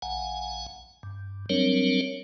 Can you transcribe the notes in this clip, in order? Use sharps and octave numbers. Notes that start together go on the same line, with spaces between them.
A#1 F#5 G#5
G2
F#3 G3 C4 D4 A#4 C#5